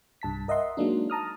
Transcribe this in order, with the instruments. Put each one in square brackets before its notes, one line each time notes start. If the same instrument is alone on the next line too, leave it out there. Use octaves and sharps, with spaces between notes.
[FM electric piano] C2 G2 A5 B6
A#4 D#5 E5 F#5 C6
F#3 G#3 A#3 D4 D#4
A5 A#5 D#6 F6